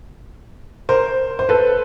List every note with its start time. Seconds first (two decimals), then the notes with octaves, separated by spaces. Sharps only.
0.89 A#4 C5
1.39 C5
1.49 A4 B4